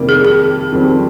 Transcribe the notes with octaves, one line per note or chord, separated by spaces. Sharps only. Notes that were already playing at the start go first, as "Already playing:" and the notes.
Already playing: F2 C3 D#3 G3 A#3
G#4
G#4
F2 D#3 G3 C4